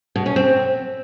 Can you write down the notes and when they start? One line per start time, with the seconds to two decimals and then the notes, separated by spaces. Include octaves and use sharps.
0.16 B2
0.26 C#4
0.36 C4